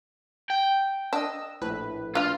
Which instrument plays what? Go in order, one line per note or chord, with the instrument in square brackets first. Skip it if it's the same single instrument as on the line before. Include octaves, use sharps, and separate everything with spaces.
[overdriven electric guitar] G5
[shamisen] D4 [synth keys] D#5 E6
[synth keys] A#1 A2 B4
[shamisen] D4 F5 [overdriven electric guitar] F4